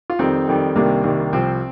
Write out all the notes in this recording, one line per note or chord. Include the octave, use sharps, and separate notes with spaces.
F4
F2 D#3 G3 C4 D#4
F2 D#3 G3
C2 C3 D#3 G3 A#3 D4
C2 C3 D#3 G3
C2 C3 F3 C4